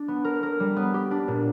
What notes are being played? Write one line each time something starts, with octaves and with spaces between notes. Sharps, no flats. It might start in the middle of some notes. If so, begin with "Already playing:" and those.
Already playing: D4
B3
A#4
A#4
G3
B3
G4
D4
A#2